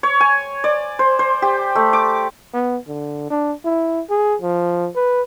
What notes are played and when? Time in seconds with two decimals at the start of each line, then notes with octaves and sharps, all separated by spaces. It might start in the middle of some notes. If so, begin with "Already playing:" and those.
0.03 C#5
0.21 G#5
0.64 D5
0.99 C5
1.19 C5
1.42 G4
1.75 A3
1.93 D6
2.54 B3
2.87 D3
3.30 D4
3.65 E4
4.10 G#4
4.41 F3
4.96 B4